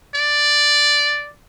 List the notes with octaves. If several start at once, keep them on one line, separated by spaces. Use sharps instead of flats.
D5